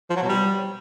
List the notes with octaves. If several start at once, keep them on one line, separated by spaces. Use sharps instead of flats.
F3
F#3
B2
G3